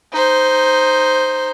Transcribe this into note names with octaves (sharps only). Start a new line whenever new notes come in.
D#4 C5